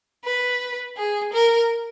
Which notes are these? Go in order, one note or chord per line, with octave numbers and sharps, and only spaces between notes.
B4
G#4
A#4